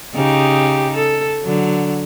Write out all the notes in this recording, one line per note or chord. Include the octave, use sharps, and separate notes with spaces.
C#3 D#4 G4
A4
D3 F#3